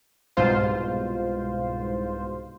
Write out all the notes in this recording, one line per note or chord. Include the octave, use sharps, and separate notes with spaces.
C2 G#2 B2 F4 C5